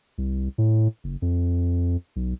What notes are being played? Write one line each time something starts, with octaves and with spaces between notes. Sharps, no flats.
C2
A2
F#1
F2
B1